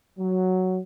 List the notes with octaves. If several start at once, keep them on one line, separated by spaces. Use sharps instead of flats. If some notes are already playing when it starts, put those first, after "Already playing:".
F#3